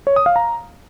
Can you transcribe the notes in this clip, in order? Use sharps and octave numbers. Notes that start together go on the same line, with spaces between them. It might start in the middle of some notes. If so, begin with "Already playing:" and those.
C#5
D#6
F5
A#5